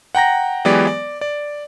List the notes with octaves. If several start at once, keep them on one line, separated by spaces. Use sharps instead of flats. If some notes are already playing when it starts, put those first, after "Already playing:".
F#5 G5 A#5 A#6
E3 F#3 G#3 B3 G4 D5
D5
D5